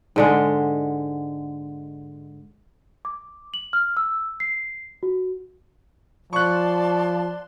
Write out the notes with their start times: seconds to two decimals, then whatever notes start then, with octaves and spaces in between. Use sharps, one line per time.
0.16 G#2 D3 G#3
3.05 D6
3.54 F#7
3.73 F6
3.97 E6
4.40 C7
5.03 F#4
6.33 F3 D5 A5 C6 C#6 F#6